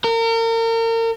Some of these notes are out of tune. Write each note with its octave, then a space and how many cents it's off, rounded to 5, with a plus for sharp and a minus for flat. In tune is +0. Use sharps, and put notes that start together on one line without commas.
A#4 -35